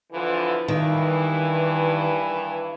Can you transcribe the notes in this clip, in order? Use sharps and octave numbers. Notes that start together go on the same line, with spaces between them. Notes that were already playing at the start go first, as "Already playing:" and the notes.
D3 E3 F3
G2 D#3 E3